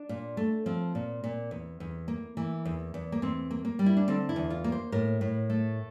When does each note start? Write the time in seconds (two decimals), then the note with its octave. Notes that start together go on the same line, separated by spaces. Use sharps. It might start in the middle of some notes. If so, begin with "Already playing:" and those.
Already playing: D4
0.09 A#2
0.37 A3
0.66 F3 C4
0.95 A#2
1.24 A#2
1.51 E2
1.80 E2
2.08 A#3
2.37 E3 A#3
2.65 E2
2.94 E2
3.12 A#3
3.22 E2 C4
3.51 A#3
3.65 A#3
3.79 G3
3.86 E4
3.97 D4
4.08 D3 C4
4.29 E4
4.36 E2
4.50 F4
4.64 A#3
4.72 C5
4.92 A2 A#4
5.21 A2
5.50 A3